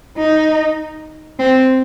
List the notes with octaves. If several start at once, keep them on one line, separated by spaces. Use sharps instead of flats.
D#4
C4